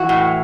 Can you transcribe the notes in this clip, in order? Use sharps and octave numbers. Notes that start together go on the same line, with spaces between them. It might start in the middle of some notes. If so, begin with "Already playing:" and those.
Already playing: E3 F#4
A2